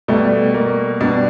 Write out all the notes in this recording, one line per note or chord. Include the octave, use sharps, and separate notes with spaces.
B2 G3 A3
A#3
B2 G3 D4